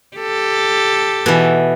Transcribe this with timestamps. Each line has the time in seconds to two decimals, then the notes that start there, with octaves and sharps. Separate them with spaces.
0.17 G4 A4
1.26 B2 E3